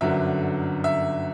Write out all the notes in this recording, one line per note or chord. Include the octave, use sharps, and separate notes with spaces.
G1 F#2 D3 F#3 E5
E5